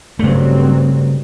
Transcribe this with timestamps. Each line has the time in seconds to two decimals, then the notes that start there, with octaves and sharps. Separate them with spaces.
0.19 G2 C#3 F#3 A3 C4